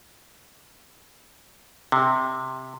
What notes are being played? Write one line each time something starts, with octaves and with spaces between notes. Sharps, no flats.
C3